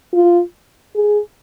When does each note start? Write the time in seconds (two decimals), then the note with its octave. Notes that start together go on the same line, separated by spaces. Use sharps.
0.13 F4
0.96 G#4